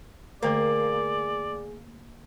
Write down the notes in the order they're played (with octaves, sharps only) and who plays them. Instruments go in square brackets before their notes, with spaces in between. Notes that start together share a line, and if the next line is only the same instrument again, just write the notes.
[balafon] D3 A3 A#4 [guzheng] A#3 [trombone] G#4 [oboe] D5